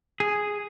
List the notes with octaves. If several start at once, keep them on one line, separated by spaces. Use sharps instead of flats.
G#4